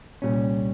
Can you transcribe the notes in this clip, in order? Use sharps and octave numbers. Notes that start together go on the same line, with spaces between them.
C2 A#2 G3 C#4